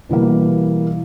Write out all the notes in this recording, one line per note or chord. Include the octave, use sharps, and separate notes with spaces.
B2 E3 G3 A#3